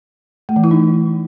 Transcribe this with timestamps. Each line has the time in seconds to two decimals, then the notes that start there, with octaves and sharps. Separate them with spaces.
0.49 A3
0.56 E3
0.64 E4
0.71 D#4